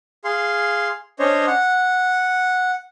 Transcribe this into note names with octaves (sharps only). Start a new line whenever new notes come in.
G#4 F5 C6
C#4 D4 C5 C#5 D#5
F#5